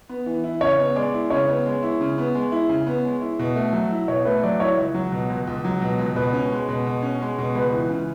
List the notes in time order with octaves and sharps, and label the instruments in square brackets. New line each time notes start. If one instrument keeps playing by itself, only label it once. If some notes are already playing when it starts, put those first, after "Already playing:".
[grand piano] B3
E3
E4
[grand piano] C#3 [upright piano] C#5
[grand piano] B3
[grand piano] G#3 [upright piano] D5
[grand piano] E4
[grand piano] C#3 [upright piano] C#5
[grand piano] B3
G#3
E4
C#3
B3
G#3
E4
C#3
B3
G#3
E4
B2
A3
F#3
E4
[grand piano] B2 [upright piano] C#5
[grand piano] A3 [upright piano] B4
[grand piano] F#3 [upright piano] D5
[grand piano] E4 [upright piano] C#5
[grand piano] C#2
F#3
B2
C#2
C#2
F#3
B2
C#2
[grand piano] B2 [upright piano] B4
[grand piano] C#4
G#3
B2
B2
C#4
G#3
B2
[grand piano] C#2 [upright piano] B4
[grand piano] E3
C#3